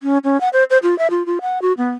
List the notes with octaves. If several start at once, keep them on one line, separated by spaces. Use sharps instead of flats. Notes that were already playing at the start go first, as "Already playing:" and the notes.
C#4
C#4
F#5
C5
C5
F4
E5
F4
F4
F#5
F#4
B3